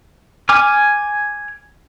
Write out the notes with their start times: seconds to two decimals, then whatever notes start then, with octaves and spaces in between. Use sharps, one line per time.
0.49 G#5 D6 F6